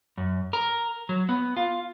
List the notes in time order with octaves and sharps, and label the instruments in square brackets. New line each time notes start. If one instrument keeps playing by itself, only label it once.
[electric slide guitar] F#2
A#4
F#3
B3
F4